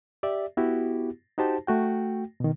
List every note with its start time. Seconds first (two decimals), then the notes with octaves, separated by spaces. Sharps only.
0.23 G4 D5 E5
0.57 B3 E4 F#4 G4
1.38 D#4 F#4 G4 C5 A5
1.67 A3 F#4 G5
2.40 B2 D#3